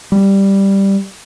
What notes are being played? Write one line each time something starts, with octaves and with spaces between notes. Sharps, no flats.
G3